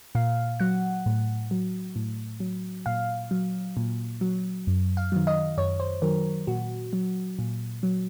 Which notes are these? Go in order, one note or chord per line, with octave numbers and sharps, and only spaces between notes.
A#2 F5
F#3 F#5
A2
F#3
A2
F#3
A#2 F5
F#3
A#2
F#3
F#2
F5
D#3 F#3
D#5
F#2 C#5
C5
D#3 F#3 A#4
A#2 F#4
F#3
A#2
F#3